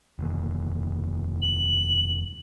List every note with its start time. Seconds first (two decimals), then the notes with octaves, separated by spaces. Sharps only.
0.19 F1 D#2
1.42 F#7